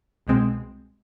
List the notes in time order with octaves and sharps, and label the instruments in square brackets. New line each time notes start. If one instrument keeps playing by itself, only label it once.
[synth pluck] C2 B2 G#3 C4